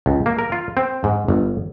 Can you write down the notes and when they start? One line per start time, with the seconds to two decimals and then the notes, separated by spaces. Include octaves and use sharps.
0.06 C#2
0.26 A#3
0.39 A#4
0.52 F4
0.77 C4
1.04 G#2
1.28 G1